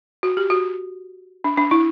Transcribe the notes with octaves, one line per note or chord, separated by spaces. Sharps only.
F#4
G4
F#4
D4
D4
E4